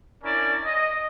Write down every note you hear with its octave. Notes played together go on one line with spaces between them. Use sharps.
C#4 D4 E4 A#4 D5
D#5